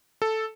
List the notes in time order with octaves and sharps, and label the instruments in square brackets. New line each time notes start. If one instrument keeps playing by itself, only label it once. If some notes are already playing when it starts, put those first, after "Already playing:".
[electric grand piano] A4